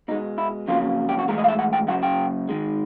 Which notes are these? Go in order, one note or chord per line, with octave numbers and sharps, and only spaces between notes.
B2 G#3 D#4
E4
F2 C#3 F#3 A#3 F4
G4
F#4
A2 E3 G#3 A#4
D#5
F5
E5
F#5
G5
F#2 C#3 F#3 F#5
G5
G#2 D#3 G#3